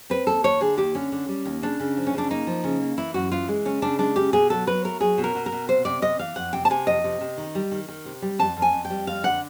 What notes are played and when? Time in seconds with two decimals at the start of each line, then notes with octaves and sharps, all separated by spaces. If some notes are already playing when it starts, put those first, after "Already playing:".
0.10 C4 B4
0.27 D#2 A4
0.44 D#2 C#5
0.61 D3 G#4
0.77 D#2 G4
0.95 D3 C#4
1.12 D3
1.28 G3
1.45 D#2
1.62 C#3 D4
1.80 C#3
1.97 F3
2.07 C#4
2.14 C#3 D4
2.31 A#3 D#4
2.47 F3
2.64 C#3
2.81 A#3
2.98 E3 E4
3.14 F#2 F#4
3.31 E3 F4
3.49 G#3
3.65 C#3 C#4
3.82 C#3 D4
3.99 G#3 D4
4.16 C#3 G4
4.33 B2 G#4
4.50 F#3 A4
4.67 F#3 B4
4.84 A3 A#4
5.00 F#3 G#4
5.18 B2
5.24 A#4
5.35 B2
5.46 A#4
5.52 B2
5.69 C3 C5
5.85 C3 D5
6.02 C3 D#5
6.19 E3 F5
6.36 F2 F#5
6.53 C3 G5
6.65 A5
6.70 C3 G#5
6.87 F2 D#5
7.04 C3
7.21 C3
7.38 D#3
7.55 G3
7.71 D#3
7.88 D#3
8.05 C3
8.22 G3
8.39 F2 A5
8.57 F2
8.62 G#5
8.73 F2
8.85 G5
8.90 G3
9.07 F2 F5
9.23 D3 F#5